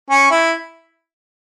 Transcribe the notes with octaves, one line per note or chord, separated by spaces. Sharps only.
C#4
E4